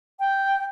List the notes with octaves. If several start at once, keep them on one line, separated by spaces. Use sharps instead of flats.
G5